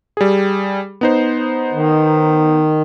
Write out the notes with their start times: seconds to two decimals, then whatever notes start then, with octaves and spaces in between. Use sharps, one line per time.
0.17 G3 G#4
1.01 B3 D#4 C5
1.73 D#3